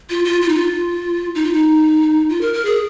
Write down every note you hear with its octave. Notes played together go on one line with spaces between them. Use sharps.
F4
F4
F4
D#4
F4
D#4
F4
D#4
F4
A#4
A#4
G#4